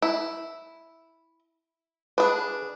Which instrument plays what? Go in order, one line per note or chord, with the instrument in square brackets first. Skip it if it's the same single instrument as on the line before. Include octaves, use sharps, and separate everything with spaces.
[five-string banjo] E4
[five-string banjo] D4 G#4 [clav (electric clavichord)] B4